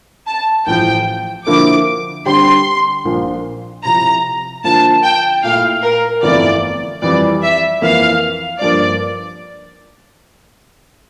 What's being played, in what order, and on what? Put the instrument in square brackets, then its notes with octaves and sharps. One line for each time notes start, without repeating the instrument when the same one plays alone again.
[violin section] A5
[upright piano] A1 A2 F3 [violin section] G5
[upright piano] D3 F3 A#3 E4 [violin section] D6
[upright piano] D3 G3 C4 G4 C5 [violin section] C6
[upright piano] A#1 A#2 F3 A#3
[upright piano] C3 F3 C4 E4 [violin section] A#5
[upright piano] D3 F3 A#3 F4 C5 [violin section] A5
[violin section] G5
[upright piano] A#2 A3 E4 [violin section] F5
[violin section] A#4
[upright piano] G1 F2 E3 A3 E4 [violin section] D5
[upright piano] F2 E3 G3 [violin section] D5
[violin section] E5
[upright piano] F2 E3 A#3 [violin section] F5
[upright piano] G2 F3 A#3 [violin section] D5